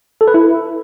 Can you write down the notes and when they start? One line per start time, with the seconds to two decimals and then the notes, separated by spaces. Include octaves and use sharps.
0.21 A4
0.28 B4
0.34 E4